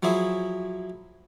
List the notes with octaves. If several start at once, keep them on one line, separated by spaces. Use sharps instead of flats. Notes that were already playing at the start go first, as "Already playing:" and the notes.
F3 F#3 E4 G#4 E5